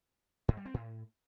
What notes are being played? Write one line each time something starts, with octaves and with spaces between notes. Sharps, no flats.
G#2
G3
C4
A2